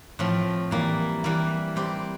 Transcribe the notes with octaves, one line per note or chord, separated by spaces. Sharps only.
A2 F3 C4
E3 G3 A#3 E4
E3 G3 A#3 E4
G3 C4 G4 C5